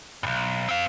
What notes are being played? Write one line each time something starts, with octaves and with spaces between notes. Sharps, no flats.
B1 G2
C4 F5